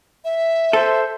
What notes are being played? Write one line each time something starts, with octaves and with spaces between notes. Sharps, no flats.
E5
A4 C5